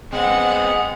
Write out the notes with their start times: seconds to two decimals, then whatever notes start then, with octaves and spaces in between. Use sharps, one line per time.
0.13 G#3 B3 C4 F#5
0.52 D#6